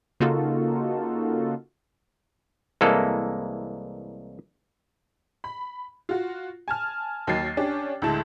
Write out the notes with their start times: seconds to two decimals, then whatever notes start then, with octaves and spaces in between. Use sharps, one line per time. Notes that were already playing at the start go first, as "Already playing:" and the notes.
0.20 C#3 A#3 D#4 F4 F#4 A4
2.81 C2 E3 G#3 A#3 A4
5.44 B5
6.09 F4 F#4
6.68 G#5 A5 F6
7.27 D#2 D#3 F#3 A6 C7
7.57 C#4 D4 G4
8.02 D2 A2 G#3 E4 A5